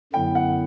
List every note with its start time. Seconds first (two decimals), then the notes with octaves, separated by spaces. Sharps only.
0.13 F#2 D3 F#3 B3 E4 G5
0.35 F#5